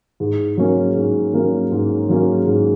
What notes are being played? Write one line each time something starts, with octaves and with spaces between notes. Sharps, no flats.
G#2
F#3 A#3 C#4
G#2
F#3 A#3 C#4
G#2
F#3 A#3 C#4
G#2